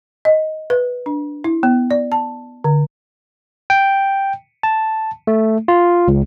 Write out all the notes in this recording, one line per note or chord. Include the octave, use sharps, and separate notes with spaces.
D#5
B4
D4
E4
B3
D5
A5
D3
G5
A5
A3
F4
C#2